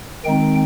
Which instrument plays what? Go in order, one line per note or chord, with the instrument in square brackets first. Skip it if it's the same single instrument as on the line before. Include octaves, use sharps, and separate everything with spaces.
[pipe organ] D#3 G#3 C4 D#4 G5